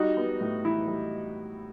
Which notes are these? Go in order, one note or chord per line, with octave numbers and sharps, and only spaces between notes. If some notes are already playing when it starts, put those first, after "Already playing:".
Already playing: G3 D#4 F#4
B3
A2
E3 E4
G3